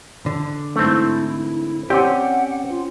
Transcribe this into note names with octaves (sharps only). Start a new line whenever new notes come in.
D3
G#2 E3 A3 C4 E4
C4 C#4 G4 D5 F#5 D6 G6
F4